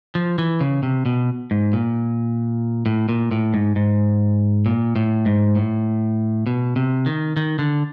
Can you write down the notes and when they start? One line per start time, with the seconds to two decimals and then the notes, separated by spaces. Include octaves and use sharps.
0.15 F3
0.38 E3
0.61 C#3
0.83 C3
1.06 B2
1.51 G#2
1.73 A#2
2.86 A2
3.09 A#2
3.31 A2
3.54 G#2
3.76 G#2
4.66 A#2
4.96 A2
5.26 G#2
5.55 A2
6.47 B2
6.76 C3
7.06 D#3
7.37 D#3
7.59 D3